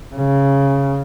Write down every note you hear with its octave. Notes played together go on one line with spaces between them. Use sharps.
C#3